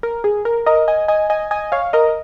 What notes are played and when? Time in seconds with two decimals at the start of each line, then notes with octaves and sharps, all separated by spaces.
0.03 A#4
0.24 G#4
0.45 A#4
0.66 A#4 D#5
0.88 D#5 G#5
1.08 D#5 G#5
1.30 D#5 G#5
1.51 D#5 G#5
1.72 C#5 F5
1.93 A#4 D#5